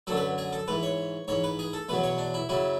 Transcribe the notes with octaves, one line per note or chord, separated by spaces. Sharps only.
F#2 D3 F#3 A4
B4
G#4
A4
G#2 E3 B4
C#5
G#2 E3 C#5
B4
G#4
A4
E2 B2 F#3 B4
C#5
D4
E4
F#2 C#3 F#3 E4